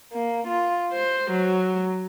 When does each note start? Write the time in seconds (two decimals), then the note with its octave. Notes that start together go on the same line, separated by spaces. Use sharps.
0.13 A#3
0.47 F4
0.92 C5
1.32 F#3